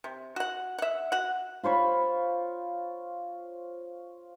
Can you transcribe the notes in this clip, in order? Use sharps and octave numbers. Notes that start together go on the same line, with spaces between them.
C3
F#4 F#5
E5 F#5
F#4 F#5
F4 C5 C#5 B5